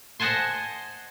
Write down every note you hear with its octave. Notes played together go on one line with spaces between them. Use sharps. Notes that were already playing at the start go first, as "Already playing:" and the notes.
C5 D#5 F#5 G#5 A5 C6